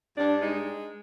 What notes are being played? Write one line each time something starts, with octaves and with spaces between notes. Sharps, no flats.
G2 D4
G#3 D#4